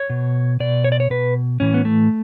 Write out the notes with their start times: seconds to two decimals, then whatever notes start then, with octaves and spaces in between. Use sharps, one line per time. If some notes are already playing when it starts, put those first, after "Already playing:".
Already playing: C#5
0.10 B2
0.60 B2 D5
0.84 C#5
0.92 D5
1.00 C#5
1.10 B2 B4
1.60 A2 E3 C#4
1.74 B3
1.85 A3